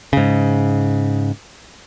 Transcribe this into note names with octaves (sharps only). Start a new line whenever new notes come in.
G#2 C#3